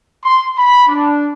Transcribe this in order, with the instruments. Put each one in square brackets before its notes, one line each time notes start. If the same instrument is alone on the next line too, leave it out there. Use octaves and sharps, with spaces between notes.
[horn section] C6
B5
D4